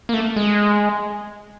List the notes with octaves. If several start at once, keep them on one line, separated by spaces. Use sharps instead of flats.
A#3
A3
G#3